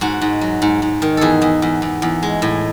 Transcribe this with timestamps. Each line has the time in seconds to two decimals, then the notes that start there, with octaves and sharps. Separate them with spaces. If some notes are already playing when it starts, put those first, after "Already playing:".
0.01 G#2 F#4
0.21 G#2
0.41 F#3
0.62 G#2
0.82 G#2
1.02 D#3
1.17 E2 G#4 A4
1.42 E2
1.62 E2
1.82 E2
2.02 E2
2.23 G#3
2.42 A2